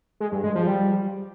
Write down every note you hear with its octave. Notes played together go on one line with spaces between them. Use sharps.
G#3
G2
G#3
F3
G3